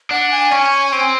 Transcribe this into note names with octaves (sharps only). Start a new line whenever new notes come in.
D4 F#5
G#5
C#4
C4